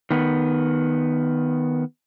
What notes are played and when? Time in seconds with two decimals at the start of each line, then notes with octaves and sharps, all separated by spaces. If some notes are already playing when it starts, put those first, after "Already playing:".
0.11 D#3 B3